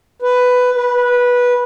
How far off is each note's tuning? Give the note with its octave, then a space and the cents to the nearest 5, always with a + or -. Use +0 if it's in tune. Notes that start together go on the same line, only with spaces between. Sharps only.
B4 +10
B4 -15